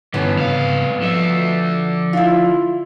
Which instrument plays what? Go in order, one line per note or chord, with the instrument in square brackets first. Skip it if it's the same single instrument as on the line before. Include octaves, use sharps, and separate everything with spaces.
[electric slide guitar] G2 D3 [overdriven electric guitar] E3 C#4 [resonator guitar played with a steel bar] B3
[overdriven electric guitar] C2 F5 [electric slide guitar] G#2 C#3 D#5
[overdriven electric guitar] D3 E5 [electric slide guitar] F3 D#5
[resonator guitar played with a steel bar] E4 F4